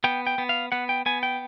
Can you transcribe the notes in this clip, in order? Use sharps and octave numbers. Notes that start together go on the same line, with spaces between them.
B3 G5
G5
B3
F5
B3 F#5
G5
B3 G#5
G5